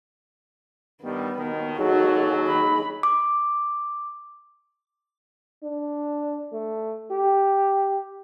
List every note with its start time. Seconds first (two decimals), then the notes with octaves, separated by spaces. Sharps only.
1.03 G2 D#3 G3 B3
1.37 D#2 B2 D#3
1.79 D#2 F#3 D#4 F#4 G#4 A4
2.48 B5
3.03 D6
5.64 D4
6.53 A3
7.11 G4